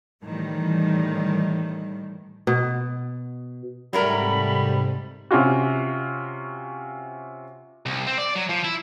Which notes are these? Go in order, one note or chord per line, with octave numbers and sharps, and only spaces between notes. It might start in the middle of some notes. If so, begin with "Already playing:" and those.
A2 D#3 E3 G3
B2
G#2 C3 F#3 G3 A3 A#4 B5
C3 C#4 F4 F#4
C2
C4
D5
F#3
F3
E4